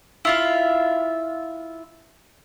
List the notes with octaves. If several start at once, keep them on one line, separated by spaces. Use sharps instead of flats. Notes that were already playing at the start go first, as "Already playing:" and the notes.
E4 F4 E5